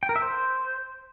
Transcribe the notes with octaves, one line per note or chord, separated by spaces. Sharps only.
G5
A#4
E5
C5